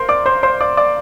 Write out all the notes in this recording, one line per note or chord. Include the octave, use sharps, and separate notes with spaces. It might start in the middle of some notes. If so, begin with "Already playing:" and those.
Already playing: A#4 C5 C6
D5 D6
C5 C6
C5 C6
D5 D6
D5 D6